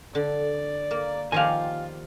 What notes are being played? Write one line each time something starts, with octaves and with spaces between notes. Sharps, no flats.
D3 D5
A#3
D#3 F3 F4 G4 F5 G#5